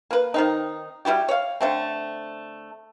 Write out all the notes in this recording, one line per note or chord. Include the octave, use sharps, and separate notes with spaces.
A#3 B4
D#3 C4 D#4
G3 E4 F#4 G4
C#5 F5
D3 A3 C4